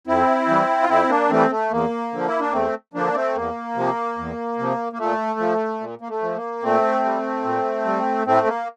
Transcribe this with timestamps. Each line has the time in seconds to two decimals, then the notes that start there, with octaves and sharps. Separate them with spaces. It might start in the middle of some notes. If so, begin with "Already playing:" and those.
0.07 F2 C4 E4
0.48 E3 G3
0.82 F4
0.88 F2 C4 E4
1.09 A#3 D4
1.29 E3 G3 A3 C4
1.50 A3
1.71 E2 A#3
2.12 D3 F3
2.28 E4
2.40 D4
2.52 E2 A3 C4
2.94 D3 F3 A#3 D4
3.15 A3 C4
3.35 E2 A#3
3.76 C3 F3
4.18 E2
4.58 C3 F3
4.93 A#3
4.99 A#2 A3
5.39 F3
5.80 A#2
6.01 A#3
6.09 A3
6.22 F3
6.36 A#3
6.63 A#2 A3 C4
7.04 G3
7.45 A#2
7.85 G3
8.26 A2 A3 C4
8.47 A#3